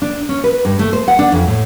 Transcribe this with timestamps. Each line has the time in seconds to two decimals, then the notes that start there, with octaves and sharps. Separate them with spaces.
0.02 D4
0.29 C#4
0.44 B4
0.65 G2
0.79 A3
0.93 C5
1.08 F#5
1.19 D4
1.32 F2
1.47 A2